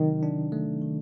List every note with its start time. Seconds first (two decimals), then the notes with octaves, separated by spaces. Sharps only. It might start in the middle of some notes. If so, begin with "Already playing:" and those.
Already playing: C3 D#3 F#3
0.23 D4
0.52 A3
0.82 D#3